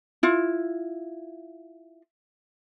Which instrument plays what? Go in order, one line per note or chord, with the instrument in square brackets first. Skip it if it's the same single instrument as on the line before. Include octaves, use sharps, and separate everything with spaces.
[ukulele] E4 F4